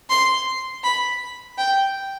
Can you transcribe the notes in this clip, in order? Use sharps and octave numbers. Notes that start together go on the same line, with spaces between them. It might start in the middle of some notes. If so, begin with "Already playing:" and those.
C6
B5
G5